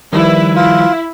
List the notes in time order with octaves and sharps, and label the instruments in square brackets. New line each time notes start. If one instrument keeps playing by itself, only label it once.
[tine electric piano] D#3 F3 G3 [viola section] E4 B4
[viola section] E4 [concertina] F4